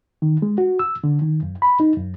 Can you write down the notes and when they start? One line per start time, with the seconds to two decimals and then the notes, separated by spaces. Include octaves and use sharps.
0.22 D#3
0.42 G#3
0.58 F#4
0.79 E6
1.04 D3
1.22 D#3
1.43 F#2
1.62 B5
1.80 D#4
1.97 F#2